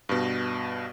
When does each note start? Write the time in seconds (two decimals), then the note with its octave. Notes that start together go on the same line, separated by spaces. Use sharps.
0.09 G2 B2